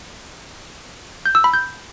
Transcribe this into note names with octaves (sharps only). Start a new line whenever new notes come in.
G6
E6
B5
G6